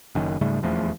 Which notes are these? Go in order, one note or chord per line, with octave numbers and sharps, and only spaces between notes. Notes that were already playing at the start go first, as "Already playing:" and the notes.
F#1 F#2 D#3
G#2 C#3 G3 A3
D#1 E2 F3 A3